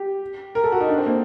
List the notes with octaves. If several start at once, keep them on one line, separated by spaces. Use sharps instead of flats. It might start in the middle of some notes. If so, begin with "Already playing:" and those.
Already playing: G4
A#4
A4
F#4
D#4
D4
C4
A#3